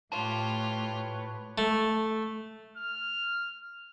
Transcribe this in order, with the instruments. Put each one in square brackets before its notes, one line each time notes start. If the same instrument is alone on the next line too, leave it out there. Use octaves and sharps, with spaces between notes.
[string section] A2 [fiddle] F4 G4 [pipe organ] B4 C#5 [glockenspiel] A5
[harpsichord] A3
[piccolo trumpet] F6